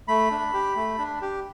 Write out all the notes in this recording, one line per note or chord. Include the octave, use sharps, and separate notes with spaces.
A3 B5
D4
G4
A3
D4
G4